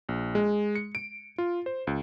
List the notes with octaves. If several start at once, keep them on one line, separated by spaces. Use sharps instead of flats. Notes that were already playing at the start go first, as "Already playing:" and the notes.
A#1
G#3
C#7
D7
F4
C5
C#2